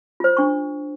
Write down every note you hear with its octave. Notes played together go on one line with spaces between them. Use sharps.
F4 C5
D4 C#6